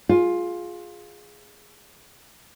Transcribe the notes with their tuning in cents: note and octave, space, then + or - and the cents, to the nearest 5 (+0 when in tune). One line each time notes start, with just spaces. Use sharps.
F4 +10 G#4 +0